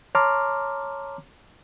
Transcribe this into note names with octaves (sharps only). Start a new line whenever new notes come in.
C#5 A5 A#5 C6 D6 F6